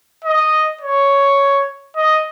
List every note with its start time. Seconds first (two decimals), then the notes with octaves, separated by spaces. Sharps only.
0.24 D#5
0.81 C#5
1.96 D#5